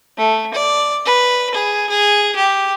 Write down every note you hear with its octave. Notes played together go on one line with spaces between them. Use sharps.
A3
D5
B4
G#4
G#4
G4